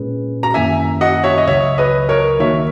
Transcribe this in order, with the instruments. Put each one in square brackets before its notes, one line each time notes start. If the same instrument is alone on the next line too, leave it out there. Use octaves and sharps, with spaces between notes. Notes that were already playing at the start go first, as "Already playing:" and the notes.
Already playing: [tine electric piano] A#2 G#3 C#4 G#4 B4
[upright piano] A#5
[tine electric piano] F#2 D#3 A#3 C#4 E4 [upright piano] E5 G#5
[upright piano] D#5 F#5
C#5 E5
D#5
[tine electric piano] C#2 C#3 F#3 [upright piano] C#5 E5
[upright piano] B4 D#5
A#4 C#5
[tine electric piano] D#3 A#3 D#4 F#4 A#4 [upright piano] C#5 E5